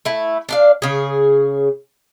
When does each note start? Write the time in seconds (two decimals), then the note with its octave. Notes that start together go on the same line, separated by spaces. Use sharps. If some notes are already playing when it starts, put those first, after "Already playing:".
0.05 A3 E4
0.49 D4 D5 F5
0.82 C#3 G#4